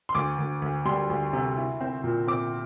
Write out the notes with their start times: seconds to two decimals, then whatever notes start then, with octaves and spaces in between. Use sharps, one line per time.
0.09 C6
0.15 D2 D6
0.39 D2
0.62 D2
0.85 G3 C6
1.10 D2
1.33 C3
1.57 E4
1.81 C4
2.04 A#2
2.28 C4 D6